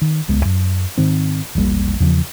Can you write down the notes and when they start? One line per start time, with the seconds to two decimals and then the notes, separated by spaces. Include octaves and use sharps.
0.01 D#3
0.28 D1 C#2 G#3 B3
0.45 F#2
0.98 G#2 D#3 C4
1.55 E1 A#1 G3 A#3
2.00 E2 C#3 F3